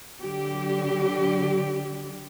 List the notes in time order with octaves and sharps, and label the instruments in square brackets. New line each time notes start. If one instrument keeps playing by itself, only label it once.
[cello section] D3 F#3 G4